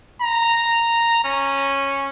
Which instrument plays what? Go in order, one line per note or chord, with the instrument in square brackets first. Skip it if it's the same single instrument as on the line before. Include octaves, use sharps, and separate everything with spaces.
[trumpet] A#5
C#4